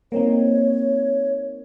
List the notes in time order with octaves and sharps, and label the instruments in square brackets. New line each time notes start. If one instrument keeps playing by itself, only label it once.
[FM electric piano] A#3 C4 D#4 [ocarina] C#5